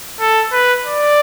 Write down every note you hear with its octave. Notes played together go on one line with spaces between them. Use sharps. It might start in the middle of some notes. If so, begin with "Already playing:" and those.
A4
B4
D5